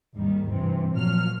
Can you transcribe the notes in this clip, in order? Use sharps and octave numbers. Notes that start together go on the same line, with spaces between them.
G#1 D#2 D#3 G3
G2 C3 E3 C4
A#2 F3 F#3 F6